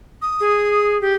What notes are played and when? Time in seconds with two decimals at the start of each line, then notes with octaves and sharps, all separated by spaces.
0.22 D#6
0.40 G#4
1.01 G4